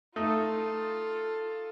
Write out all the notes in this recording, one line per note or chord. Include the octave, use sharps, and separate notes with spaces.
A3 D#4 F4 A4